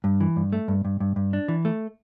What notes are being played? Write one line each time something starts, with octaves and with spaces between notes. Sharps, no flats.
G2
E3
G2
A3
G2
G2
G2
G2
D4
E3
A3